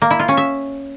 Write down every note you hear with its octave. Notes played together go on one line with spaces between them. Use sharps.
A#3
E4
F4
C#4
E5